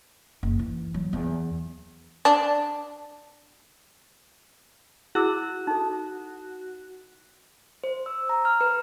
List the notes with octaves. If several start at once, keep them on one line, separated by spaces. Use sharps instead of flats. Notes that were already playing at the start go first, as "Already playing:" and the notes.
F#1
E3
F#3
E2
D4
E4 F#4 G#4 E6
D#4 A4
C5
E6
A#5
F6
B4